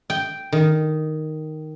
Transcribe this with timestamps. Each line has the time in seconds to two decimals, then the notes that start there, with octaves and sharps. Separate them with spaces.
0.10 G5
0.52 D#3